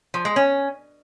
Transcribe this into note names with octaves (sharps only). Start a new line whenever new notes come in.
F3
G#3
C#4